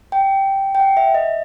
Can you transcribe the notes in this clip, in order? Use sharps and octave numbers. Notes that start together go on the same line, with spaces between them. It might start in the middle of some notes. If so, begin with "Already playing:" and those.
G5
G5
F#5
E5
D#5